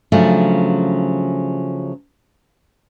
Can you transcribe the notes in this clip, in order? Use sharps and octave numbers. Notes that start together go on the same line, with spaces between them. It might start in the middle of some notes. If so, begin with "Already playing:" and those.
C#3 F3 F#3 A3 D4